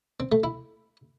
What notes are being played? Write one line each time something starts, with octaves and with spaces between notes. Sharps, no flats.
C4
A3
E4